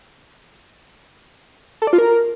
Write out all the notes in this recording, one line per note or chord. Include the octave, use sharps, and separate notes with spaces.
A4
D5
F4
A#4